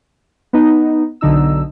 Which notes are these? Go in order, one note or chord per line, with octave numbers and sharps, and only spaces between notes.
B3 D#4
B1 D3 D#4 E6